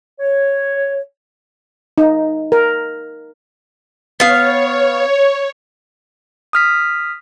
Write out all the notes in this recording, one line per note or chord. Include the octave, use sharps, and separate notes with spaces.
C#5
D#4
A#4
B3 C#5 F5
D#6 F6 B6